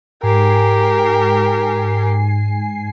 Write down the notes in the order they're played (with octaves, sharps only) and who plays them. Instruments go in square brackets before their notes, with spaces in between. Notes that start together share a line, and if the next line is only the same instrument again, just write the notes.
[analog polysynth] G#2 G#5 C7 [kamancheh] G4 A#4